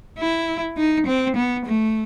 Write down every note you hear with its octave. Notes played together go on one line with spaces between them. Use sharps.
E4
D#4
C4
B3
A3